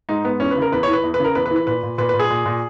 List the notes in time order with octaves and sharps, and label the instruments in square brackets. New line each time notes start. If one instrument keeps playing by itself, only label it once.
[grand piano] G#2 D#4
G#2 B3
E2 C#4
B4
C#3
A#4
E2 B4
E3 C#5
B4
E2
B4
C#3 A#4
E2 B4
B4
E3
B4
A#2 B4
A#2
A#2 B4
A#2 B4
G#4
A#2
A#2